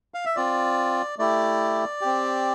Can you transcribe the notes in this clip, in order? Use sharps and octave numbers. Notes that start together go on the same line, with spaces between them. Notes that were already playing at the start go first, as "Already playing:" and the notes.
F5
E5
C4 F4 D5
A3 E4 G4 D5
C4 G4